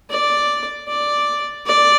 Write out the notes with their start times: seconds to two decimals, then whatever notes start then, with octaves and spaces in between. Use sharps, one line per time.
0.10 D5
0.88 D5
1.66 D5